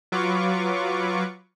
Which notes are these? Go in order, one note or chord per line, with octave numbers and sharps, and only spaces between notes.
F#3 F4 B4 C#6 D6